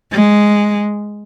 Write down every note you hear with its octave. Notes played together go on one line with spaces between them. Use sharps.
G#3